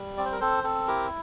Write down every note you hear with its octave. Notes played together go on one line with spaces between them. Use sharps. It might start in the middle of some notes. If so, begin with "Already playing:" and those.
Already playing: G3
C4 D5
C5
A#4
C4 A4 C5
C4 A4
E4 G4 A#4